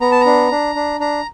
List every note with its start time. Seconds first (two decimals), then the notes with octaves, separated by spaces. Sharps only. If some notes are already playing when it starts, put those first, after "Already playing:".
0.01 B3 A#5
0.11 A5
0.21 A#5
0.26 D4
0.51 D4
0.75 D4
1.00 D4 A#5